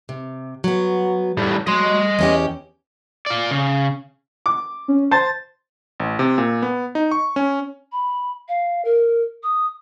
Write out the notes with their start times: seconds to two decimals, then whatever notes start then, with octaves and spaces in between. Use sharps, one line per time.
0.09 C3
0.64 F#3 B3
1.38 A2 G3
1.67 F#3 D#5 C6
2.19 E2 C#4 G4
3.26 F4 D5
3.51 C#3
4.46 D6
4.88 C#4
5.11 C5 A5 A6
6.00 A1
6.19 C3
6.38 A#2
6.62 B3
6.95 D#4
7.11 C#6
7.36 C#4
7.92 B5
8.48 F5
8.85 A#4
9.43 D#6